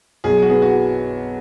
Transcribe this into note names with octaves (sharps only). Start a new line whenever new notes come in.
B1 G#4
F#4
B3 G#4
F#4